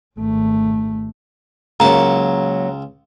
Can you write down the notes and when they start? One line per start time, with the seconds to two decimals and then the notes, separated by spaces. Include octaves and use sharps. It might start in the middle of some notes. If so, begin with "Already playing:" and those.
0.17 G#1 A3
1.80 C#2 F#3 A#3 A5 A#5